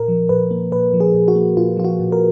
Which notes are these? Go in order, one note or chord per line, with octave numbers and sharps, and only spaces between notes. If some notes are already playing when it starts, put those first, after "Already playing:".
Already playing: A#2 A#4
F3
A#2 B4
A#3
A#2 B4
F3
G#4
A#2
F#4
A#3
A#2 F4
F3 F4
F#4
A#2
A#4